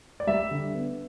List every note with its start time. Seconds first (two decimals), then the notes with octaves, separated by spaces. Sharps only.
0.20 D5
0.27 G3 E5
0.51 D3
0.74 B3